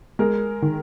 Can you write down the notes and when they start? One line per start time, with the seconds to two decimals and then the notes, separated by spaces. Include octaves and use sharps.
0.19 G#3 A#4
0.62 D#3